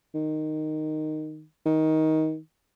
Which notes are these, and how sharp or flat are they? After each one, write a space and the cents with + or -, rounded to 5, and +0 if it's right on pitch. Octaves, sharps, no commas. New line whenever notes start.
D#3 -10
D#3 +20